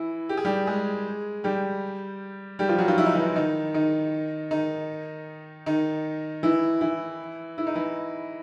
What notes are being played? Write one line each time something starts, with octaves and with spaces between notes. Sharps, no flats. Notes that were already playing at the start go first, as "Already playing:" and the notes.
Already playing: E3 E4
G4
G#4
G3 G4
G#3 G#4
G3 G4
G3 G4
F3 F4
F#3 F#4
F3 F4
E4
D#4
E3 E4
D#3 D#4
D#3 D#4
D#3 D#4
D#3 D#4
E3 E4
E3 E4
E4
D#4
E3 E4